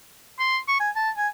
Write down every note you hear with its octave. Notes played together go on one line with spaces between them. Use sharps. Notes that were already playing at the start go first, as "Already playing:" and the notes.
C6
C#6
G#5
A5
G#5